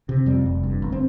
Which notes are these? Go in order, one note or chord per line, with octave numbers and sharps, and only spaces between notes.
C3
F2 G3
F1
G2
G1
C4